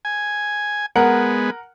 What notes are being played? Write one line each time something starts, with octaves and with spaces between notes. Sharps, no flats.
G#5
G#3 B3 A#4 F#5